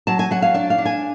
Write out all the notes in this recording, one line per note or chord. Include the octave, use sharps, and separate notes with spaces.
F#3 A5
G#5
F#3 F#5
F5
D4 D5
F5
D4
G#5